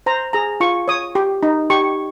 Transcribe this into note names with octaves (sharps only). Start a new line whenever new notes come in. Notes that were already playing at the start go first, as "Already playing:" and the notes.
C5 A#5
G#4 A#5
F4 C#6
C#5 D#6
G4
D#4
G4 C#6